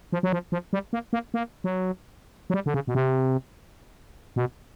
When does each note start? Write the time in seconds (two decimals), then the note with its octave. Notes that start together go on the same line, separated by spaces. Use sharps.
0.12 F3
0.23 F#3
0.32 F3
0.52 F3
0.73 G3
0.93 A#3
1.13 A#3
1.34 A#3
1.64 F#3
2.50 F#3
2.54 G3
2.66 D3
2.74 C#3
2.87 B2
2.95 C3
4.36 B2